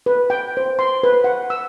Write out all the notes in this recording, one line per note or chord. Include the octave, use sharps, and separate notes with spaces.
B4
G5
C5
C6
B4
F#5
E6